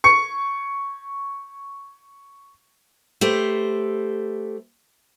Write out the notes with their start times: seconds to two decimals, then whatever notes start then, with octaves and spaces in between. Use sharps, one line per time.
0.04 C#6 C#7
3.21 A3 G4 B4 C5